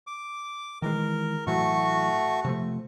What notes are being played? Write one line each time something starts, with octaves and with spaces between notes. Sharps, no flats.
D6
D#3 E3 G#3 A#4
A2 E3 F#3 A3 F#4 C#6
C3 F3 A3